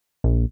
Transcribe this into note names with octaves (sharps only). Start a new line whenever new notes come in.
A#1